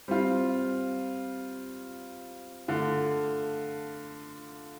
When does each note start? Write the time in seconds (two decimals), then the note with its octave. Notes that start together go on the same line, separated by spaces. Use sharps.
0.08 G3 C4 F4
2.68 D3 A3 F4